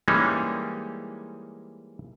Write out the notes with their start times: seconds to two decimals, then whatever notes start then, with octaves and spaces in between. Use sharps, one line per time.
0.08 E3 G3 G#3 A#3 C#4 D#4